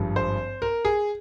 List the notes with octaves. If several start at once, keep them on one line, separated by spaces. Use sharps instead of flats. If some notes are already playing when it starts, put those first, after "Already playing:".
Already playing: G#1 G2 F3
C5
A#4
G#4